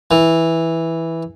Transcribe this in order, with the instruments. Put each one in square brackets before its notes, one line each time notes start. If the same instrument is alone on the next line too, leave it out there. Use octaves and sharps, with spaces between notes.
[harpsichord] E3